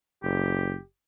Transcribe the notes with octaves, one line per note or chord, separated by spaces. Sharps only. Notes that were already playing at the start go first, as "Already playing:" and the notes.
F#1 G4